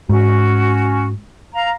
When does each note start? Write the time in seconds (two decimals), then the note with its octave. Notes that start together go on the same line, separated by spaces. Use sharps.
0.09 G#2 C#4 F#4
1.54 F5 A#5